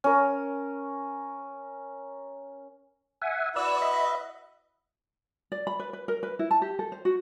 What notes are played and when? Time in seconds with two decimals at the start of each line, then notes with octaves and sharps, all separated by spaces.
0.04 C#4 A#4
3.22 E5 F#5 G#5
3.56 E4 F#4 B4 D5 E6
3.82 D#5 E5
5.52 D5
5.67 B5
5.79 B4
5.93 B4
6.08 A#4
6.23 B4
6.39 E4
6.51 A5
6.62 G4
6.79 A4
6.92 C5
7.05 F#4